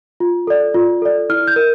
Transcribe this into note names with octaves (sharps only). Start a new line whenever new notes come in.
F4
A4 D5
F4
A4 D5
E4 F6
G6
A#4